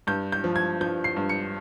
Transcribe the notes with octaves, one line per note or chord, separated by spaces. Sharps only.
G2 G6
G6
F3
G#6
F3 G6
C7
G2
C#7